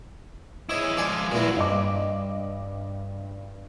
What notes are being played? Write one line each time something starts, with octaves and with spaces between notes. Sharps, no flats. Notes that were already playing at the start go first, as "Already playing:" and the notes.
E4 G#4 C#5 D#5
F3 G#3 D5 G#5
A#2 E3 G#3 F#4
G2 D#5 D6